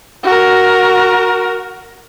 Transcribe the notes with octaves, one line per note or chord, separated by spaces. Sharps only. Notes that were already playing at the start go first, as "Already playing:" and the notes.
F#4 A#4